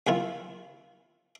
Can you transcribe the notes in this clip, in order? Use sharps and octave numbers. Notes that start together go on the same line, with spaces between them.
D#2 D#3 E4 F4